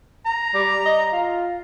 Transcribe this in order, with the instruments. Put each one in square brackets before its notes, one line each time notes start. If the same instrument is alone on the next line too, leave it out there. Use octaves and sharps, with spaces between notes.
[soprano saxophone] A#5
[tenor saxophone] G3
D#5
F4